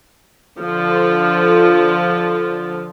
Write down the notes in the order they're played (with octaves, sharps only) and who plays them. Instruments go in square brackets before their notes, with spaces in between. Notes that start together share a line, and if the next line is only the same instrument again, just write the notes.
[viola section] D3 F3 F4 A4